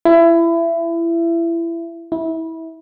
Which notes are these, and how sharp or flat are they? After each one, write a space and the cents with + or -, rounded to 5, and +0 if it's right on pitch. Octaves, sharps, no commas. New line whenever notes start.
E4 +25
E4 -25